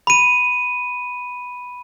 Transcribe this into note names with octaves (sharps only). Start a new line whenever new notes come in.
B5 D#7